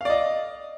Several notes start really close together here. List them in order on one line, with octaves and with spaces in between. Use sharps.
F5 D5 D#5